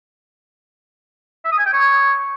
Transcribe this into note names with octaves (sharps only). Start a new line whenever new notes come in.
E5
D#6
G#5
G5
C#5